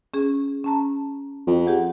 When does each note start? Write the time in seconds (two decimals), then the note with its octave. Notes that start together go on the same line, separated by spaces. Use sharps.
0.14 C#4 G#4
0.64 C#4 A5 A#5
1.47 F2
1.66 G4 G#4 F#5